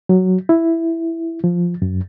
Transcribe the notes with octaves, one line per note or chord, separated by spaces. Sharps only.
F#3
E4
F3
F#2